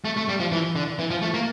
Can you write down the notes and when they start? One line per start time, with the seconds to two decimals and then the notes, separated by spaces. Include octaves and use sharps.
0.05 A3
0.17 A3
0.29 G3
0.40 F3
0.52 E3
0.76 D3
0.99 E3
1.11 F3
1.22 A3
1.34 A#3